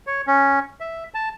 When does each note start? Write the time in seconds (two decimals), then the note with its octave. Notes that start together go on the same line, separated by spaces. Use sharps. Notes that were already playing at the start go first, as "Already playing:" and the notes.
0.07 C#5
0.27 C#4
0.80 E5
1.14 A5